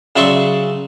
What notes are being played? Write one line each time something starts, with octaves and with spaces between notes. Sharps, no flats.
C#3 F#3 D5 E5 C6 C#6